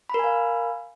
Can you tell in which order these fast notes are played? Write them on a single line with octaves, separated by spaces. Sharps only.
B5 A#4 G#5 F5